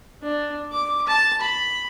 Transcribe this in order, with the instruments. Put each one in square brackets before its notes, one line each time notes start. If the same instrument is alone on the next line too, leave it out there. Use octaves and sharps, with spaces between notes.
[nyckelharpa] D4
D6
A5
B5